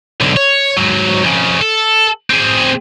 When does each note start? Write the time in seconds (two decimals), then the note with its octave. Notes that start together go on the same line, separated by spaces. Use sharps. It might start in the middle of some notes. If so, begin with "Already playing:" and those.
0.21 B1 D3
0.37 C#5
0.77 G#2 F#3
1.23 F2 C#3
1.61 A4
2.30 C4 G#4